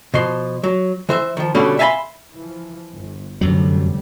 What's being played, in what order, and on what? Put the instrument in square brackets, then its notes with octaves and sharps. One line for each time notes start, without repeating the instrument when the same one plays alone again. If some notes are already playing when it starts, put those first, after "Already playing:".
[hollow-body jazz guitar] B2 F3 C6
F#3
E3 C5 E5
D#3 F3
B2 D3 G3 B3 C#4 F5
E5 F5 G#5 A5 B5 C6
[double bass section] E3 F3
G1
[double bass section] F1 D3 G3 [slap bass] F#2 F#3